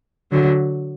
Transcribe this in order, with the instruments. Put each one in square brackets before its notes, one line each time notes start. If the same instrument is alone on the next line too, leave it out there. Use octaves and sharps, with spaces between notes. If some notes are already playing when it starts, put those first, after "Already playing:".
[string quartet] D3 F#3